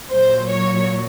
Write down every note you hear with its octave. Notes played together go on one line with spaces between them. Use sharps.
A#2 F#3 C5
C#5